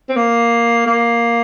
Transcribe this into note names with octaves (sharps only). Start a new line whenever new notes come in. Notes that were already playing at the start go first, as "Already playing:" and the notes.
C4
A#3
A#3